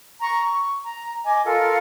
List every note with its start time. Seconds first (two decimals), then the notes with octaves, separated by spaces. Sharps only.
0.21 A#5 C#6
0.44 C#6
0.83 A#5
1.24 D#5 G#5 D6
1.45 F4 A4 A#4 F5